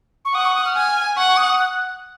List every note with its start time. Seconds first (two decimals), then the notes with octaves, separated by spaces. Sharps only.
0.25 C#6
0.34 F#5 D#6
0.45 C#6
0.55 D#6
0.65 F6
0.76 G#5
1.16 F#5 C#6
1.27 C#6
1.37 D#6
1.48 D#6
1.58 F#6